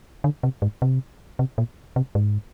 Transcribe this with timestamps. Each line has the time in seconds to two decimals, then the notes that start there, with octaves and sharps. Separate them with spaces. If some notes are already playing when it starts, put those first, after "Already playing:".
0.24 D3
0.43 C3
0.62 G#2
0.82 C3
1.39 C3
1.58 A#2
1.96 C3
2.15 G#2